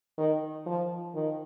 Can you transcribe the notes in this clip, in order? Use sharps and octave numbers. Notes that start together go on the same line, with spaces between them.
D#3
F3
D#3